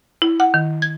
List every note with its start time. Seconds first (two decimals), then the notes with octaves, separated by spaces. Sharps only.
0.22 E4
0.40 F#5
0.54 D#3
0.82 G#6